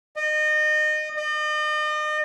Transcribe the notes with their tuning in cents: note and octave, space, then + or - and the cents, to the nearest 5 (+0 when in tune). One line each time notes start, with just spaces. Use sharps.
D#5 -30
D#5 -40